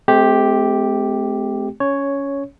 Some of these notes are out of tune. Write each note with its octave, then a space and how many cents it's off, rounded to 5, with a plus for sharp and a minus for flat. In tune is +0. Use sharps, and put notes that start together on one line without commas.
A3 -45 C4 -25 G4 +0
C#4 +15 C#5 +0